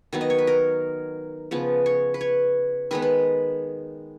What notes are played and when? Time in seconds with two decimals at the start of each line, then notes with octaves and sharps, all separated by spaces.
0.13 D#3 F#3 B3
0.21 D#5
0.30 C#5
0.38 B4
0.47 A#4
1.51 C#3 F3 B3
1.86 C#5
2.14 B4
2.21 C#5
2.91 D#3 G#3 B3 B4
3.02 B4